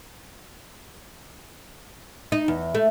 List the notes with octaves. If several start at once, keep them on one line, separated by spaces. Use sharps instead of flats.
D#4
E2
A3